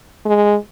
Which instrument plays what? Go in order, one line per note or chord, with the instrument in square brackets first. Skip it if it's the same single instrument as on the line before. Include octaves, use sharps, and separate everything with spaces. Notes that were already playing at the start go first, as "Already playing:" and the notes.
[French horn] G#3